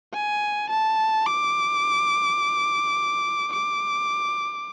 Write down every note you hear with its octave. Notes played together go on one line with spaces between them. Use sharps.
G#5
A5
D6
D6